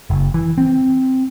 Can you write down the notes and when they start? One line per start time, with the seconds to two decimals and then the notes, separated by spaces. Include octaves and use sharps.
0.10 F#1
0.34 E3
0.58 C4